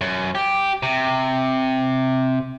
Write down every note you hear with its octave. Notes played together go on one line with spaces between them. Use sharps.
F#2
G4
C3